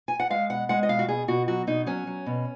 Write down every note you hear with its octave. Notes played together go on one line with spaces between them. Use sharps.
G#5
F#5
G#3 F5
B2 F#5
G#3 F#5
D#5
B2 F5
F#4
B2 G#4
B2 F#4
F#3 F#4
B2 D#4
F#3 C#4
F#3
B2